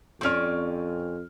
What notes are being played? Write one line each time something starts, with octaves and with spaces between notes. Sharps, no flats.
F2 C4 C#4 D5 C#6 F6